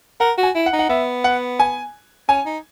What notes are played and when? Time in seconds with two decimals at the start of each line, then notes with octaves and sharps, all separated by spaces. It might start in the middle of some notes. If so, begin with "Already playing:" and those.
0.20 A#4 F#5
0.37 F#4
0.43 G#5
0.55 E4
0.66 F#5
0.73 D#4
0.79 F#5
0.89 B3 E5
1.24 F#5
1.60 G#5
2.29 C#4 G#5
2.46 D#4